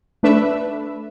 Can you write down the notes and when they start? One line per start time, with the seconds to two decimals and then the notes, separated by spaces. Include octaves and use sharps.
0.23 A3 D4 B4 E5